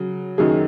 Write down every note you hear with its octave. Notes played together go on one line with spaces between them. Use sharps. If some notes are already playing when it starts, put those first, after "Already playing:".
Already playing: C#3 F#3
F#2 D#3 F#3 G#4